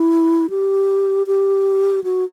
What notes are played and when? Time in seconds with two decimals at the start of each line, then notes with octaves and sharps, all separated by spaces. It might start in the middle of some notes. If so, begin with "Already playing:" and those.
Already playing: E4
0.50 G4
1.27 G4
2.04 F#4